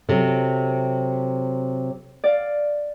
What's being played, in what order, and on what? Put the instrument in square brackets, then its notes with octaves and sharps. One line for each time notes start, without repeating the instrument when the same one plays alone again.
[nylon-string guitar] C3 F#3 [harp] A4
[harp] D5 F5